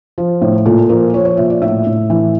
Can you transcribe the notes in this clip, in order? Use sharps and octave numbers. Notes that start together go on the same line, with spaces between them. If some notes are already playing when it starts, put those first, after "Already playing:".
F3
A2
A#2 A4
F3 A#4
F3 C#5
C#5
A#2 E5
D5
A2 E5
A2
E3